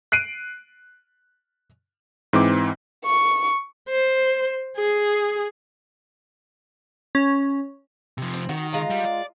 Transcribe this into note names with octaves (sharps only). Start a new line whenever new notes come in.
F#6 C7 D7 D#7
G#2 E3 C4 D6
C#6
C5
G#4
C#4
C3 F3
C4
D#3 F#4
G#3 F4 A#5
G3
D5